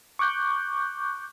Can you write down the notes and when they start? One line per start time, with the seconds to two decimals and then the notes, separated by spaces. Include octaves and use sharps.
0.19 C#6 D6 F#6 G6